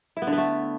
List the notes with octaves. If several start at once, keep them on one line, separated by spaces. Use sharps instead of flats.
E4
B3
D3
B3
A3